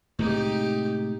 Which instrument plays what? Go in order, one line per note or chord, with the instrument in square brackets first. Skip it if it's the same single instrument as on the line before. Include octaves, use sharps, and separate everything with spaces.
[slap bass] A2 C3 G#3 [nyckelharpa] D#4 G4